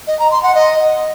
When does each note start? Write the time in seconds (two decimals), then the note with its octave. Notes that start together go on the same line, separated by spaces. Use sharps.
0.07 D#5
0.19 A#5
0.31 C6
0.43 F#5
0.55 D#5